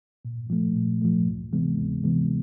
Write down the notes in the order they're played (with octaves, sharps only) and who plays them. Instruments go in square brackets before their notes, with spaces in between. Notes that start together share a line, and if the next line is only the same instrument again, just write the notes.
[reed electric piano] A#2
F3 A3
A#2
F3 A3
D2
C3 E3 G#3 B3
D2
C3 E3 G#3 B3